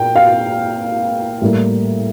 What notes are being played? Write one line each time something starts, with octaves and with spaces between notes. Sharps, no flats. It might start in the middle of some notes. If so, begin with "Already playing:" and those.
Already playing: A#2 G5
F5
A2 G3 A#3